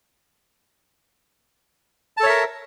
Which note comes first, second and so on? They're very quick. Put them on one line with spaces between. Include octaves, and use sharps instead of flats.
A5 A4 C#5 E5 A#4